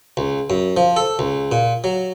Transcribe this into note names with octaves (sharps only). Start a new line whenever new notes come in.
C#2
F#2
F3
A4
C#2
A#2
F#3